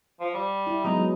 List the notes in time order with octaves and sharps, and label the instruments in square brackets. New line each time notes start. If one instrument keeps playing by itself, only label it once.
[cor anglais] F3
G3
[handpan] E4
[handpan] F#3 G#3 B3 [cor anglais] D#4
[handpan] F#3